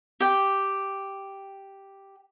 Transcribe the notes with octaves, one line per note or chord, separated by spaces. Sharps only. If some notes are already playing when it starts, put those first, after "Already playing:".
G4 G5